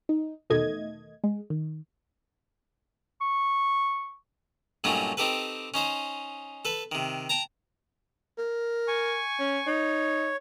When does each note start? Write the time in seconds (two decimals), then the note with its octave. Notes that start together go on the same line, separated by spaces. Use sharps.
0.09 D#4
0.50 E2 B2 D#3 A3 D#5 G#6
1.24 G#3
1.50 D#3
3.21 C#6
4.84 G2 A#2 F#3 A3 C#4 D#4
5.17 C4 D#4 G4 A4 B4
5.74 C#4 D#4 C5
6.65 A4 B4
6.92 C3 D#3
7.29 G5 A5 A#5
8.38 A#4
8.88 G#5 C#6
9.39 C#4
9.67 D#4 C#5